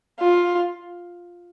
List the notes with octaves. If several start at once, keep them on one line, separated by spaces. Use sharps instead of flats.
F4